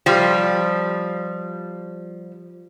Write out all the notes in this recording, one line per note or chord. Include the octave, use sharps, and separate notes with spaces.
F3 G3